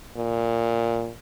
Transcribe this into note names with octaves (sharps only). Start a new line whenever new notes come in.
A#2